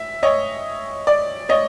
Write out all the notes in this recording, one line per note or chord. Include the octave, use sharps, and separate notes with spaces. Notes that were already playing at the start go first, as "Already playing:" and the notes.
Already playing: E5
C#5 D#5
D5
C#5 D#5